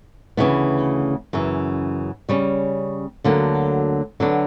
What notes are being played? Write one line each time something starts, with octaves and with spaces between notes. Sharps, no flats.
D2 C#3 E3 B3
F#2 C#3 E3
C#3 G3 C#4
D2 D3 F#3 A#3
D3 F#3 B3 D4 F#4